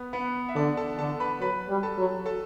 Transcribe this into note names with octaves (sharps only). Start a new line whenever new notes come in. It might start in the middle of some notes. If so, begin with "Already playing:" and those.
Already playing: B3 B4
B3 B4
E5
D3 D4 D5
A4 A5
D3 A4 A5
B4 B5
F#3 B4 B5
G3
A4 A5
F#3
A4 A5